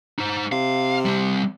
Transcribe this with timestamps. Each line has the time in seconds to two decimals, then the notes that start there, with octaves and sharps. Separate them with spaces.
0.19 D#4 C5
0.52 C3 F5
1.05 G3 C4